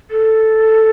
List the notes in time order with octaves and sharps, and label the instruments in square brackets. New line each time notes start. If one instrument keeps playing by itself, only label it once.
[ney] A4